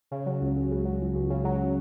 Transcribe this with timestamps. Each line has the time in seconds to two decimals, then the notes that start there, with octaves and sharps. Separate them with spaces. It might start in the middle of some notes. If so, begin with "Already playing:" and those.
0.11 C#3
0.26 F#3
0.41 C#2
0.56 C#2
0.71 C#3
0.85 F#3
1.01 C#2
1.15 C#2
1.30 C#3
1.45 F#3